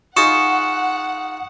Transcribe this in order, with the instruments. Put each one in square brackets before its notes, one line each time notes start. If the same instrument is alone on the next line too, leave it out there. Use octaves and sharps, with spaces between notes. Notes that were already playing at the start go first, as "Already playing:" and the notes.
[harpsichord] D#4 F4 G#4 [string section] F#5 [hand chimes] C#6 [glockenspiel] D#6 C#7 E7